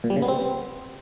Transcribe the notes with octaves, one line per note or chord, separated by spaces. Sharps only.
A#2
G3
C#3
B3
C4